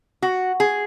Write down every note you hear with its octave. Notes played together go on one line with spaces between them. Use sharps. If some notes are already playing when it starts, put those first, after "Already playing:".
F#4
G#4